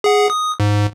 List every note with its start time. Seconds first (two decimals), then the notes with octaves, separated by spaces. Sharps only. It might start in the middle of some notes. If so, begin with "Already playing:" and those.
0.04 G#4 F#5
0.30 D#6
0.60 G#2